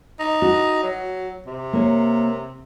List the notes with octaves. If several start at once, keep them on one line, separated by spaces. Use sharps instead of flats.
D#4
F#4
F#3
C3
A#3 C#5